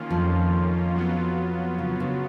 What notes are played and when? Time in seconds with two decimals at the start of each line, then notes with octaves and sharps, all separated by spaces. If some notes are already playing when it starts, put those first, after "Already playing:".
Already playing: D#3 A#3 C#4 F4
0.10 F2 F3
0.95 F#3 B3 F4
1.78 C#3
2.00 C#3